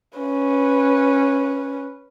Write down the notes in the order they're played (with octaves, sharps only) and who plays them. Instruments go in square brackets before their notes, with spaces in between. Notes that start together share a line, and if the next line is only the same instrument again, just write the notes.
[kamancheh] C#4 B4